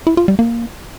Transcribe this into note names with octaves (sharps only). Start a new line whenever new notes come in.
E4
F4
G3
A#3